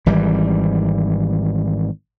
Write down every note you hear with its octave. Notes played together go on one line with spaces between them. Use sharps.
G#1 E3 G3